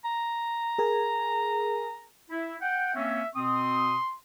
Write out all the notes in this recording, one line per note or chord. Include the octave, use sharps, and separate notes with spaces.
A#5
G#4 A#4 G#5
E4
F#5 G5
A#3 C4 C#4 E5
B2 C4 C6 D#6